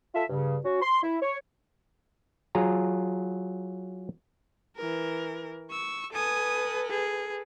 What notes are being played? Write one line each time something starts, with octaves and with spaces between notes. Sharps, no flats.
F4 A4 E5
G2 C#3
C#4 F#4
C6
E4
C#5
F#3 F4 G#4 A#5
E3 A#4
C#6 E6
A4 B4 G#5 D#6
G#4